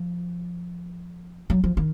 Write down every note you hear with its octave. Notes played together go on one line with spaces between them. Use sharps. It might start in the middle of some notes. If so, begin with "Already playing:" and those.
Already playing: F3
F#3
F3
D#3